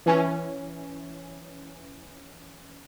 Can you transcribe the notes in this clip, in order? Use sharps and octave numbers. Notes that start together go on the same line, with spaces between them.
E3 C#4